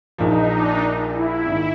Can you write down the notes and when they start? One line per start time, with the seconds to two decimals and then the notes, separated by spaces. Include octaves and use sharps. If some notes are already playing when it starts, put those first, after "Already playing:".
0.18 A#1 A#2 F3 D#4
0.50 D4
1.14 E4
1.45 G#1 G#2 D#3